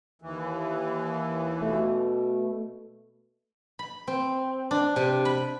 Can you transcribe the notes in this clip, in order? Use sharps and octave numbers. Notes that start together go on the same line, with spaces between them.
D#2 E3
B2 A3
B5
C4
D4
C3
B5